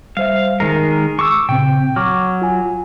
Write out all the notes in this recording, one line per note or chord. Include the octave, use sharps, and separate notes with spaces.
G3 C5 E5 F5
D#3 G#3 A#4 C7
C#6 D6 E6
A#2 C#3 C4 G5
F#3 C#6 D6 F6
F4 G#5